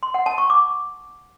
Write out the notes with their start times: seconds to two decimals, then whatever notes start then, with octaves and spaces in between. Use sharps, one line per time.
0.03 C6
0.14 F#5
0.26 A5
0.38 C#6
0.50 D6